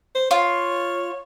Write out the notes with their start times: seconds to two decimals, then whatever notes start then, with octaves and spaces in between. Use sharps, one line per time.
0.15 C5
0.31 F4 C#5